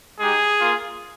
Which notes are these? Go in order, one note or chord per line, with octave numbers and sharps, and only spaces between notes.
G#3 D#4 G4 G#4
A#3 F4